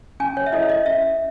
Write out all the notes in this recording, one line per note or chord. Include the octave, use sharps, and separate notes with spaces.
C#4 G#5
C#5
E5
E4 A4 C#5 D#5
D#5
C#4 E5